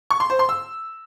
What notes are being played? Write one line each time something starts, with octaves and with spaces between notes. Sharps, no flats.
C#6
C6
C5
C6
E6